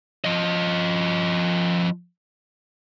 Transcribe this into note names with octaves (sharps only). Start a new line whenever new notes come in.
F3 D#5